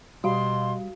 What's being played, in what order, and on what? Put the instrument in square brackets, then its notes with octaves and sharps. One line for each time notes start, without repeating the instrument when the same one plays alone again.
[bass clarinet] B2 [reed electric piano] G3 [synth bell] F#4 F5 [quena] C6